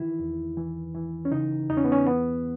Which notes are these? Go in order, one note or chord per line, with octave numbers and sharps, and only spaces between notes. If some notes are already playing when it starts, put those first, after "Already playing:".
Already playing: D#3 E3 E4
E2
E3
E3
C#4
C#3 D#4
E2 D#4
C#4
B3
C#4
E3 B3